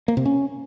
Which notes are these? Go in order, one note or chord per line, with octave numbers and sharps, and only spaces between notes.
A#3
C3
C#4